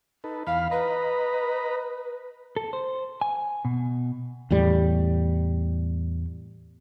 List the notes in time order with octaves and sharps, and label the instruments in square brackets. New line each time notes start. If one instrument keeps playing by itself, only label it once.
[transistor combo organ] D#4 A4 B4
[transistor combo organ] E2 B5 F6 [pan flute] F5
[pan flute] B4 [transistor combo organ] D#5 A#5 B5
[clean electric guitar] A4
C5
G#5
B2
[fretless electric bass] E2 A2 G3